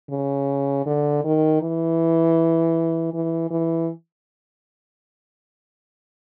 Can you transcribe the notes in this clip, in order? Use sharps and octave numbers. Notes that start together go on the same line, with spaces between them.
C#3
D3
D#3
E3
E3
E3